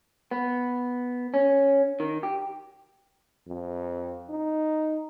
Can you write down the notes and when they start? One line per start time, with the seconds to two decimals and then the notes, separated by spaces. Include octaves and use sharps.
0.31 B3
1.34 C#4
2.00 D#3
2.23 G4
3.47 F2
4.30 D#4